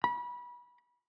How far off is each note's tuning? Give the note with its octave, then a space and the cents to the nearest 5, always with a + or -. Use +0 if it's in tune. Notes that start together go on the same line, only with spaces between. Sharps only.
B5 -25